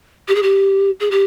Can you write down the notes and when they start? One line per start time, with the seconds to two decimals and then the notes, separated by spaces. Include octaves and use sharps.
0.28 G4
0.35 G#4
0.42 G4
1.00 G#4
1.11 G4